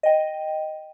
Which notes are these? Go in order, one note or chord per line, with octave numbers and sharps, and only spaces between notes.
D#5 G5